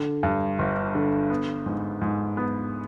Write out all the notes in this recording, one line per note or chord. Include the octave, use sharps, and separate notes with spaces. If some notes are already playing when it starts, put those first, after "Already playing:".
Already playing: D3
G2
G1
D3
B3
G#2
G#2
B3